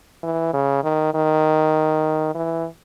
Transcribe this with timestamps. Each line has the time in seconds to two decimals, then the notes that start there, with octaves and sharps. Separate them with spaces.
0.23 E3
0.54 C#3
0.84 D#3
1.14 D#3
2.35 E3